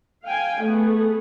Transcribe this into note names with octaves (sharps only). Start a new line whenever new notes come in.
F5 G5 G#5
A3 B3 G#4